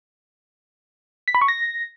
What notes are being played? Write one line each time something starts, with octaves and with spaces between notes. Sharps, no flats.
B6
B5
C#6
A#6